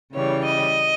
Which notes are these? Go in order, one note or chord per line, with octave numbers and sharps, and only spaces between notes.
C#3 E3 G3 C#5
D#5